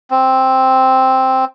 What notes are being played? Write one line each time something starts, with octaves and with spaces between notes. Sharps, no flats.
C4